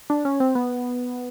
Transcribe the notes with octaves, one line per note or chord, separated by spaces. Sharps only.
D4
C#4
C4
B3